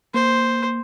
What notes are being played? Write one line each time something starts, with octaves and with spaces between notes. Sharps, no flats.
A#3 C5